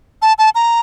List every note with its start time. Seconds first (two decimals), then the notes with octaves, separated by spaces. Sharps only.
0.22 A5
0.38 A5
0.55 A#5